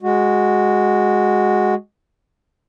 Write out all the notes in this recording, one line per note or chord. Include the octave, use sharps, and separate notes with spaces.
G#3 F#4